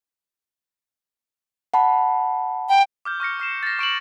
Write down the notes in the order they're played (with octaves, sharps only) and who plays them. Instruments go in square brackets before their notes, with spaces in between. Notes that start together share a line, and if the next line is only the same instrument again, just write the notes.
[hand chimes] F#5 A5 B5
[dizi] G5
[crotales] D6 F6 G6
C#6 F6 A#6 C#7
F6 C7 E7
A6 A#6
C#6 D7 E7 F#7